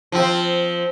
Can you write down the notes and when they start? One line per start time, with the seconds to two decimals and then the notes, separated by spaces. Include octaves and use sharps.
0.12 F3 C4